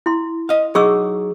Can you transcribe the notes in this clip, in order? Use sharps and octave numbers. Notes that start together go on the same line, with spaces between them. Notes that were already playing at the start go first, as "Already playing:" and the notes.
E4 C6
D#5 F5
F#3 D#4 G#4 C#6 E6